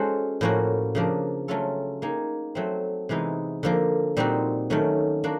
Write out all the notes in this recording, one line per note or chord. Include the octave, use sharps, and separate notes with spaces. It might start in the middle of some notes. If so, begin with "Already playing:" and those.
Already playing: G#3 C#4 F#4 A4 C5
A2 F3 A#3 C#4 F#4
C#3 F3 A#3 D4
F#3 A3 C#4 F4 A4
A#3 D#4 G#4
F#3 A3 C4
C3 E3 G#3 B3 D#4
D3 F3 A#3
A#2 G3 C4 D#4 F#4
D#3 F#3 A3 C#4
A#3 D4 F#4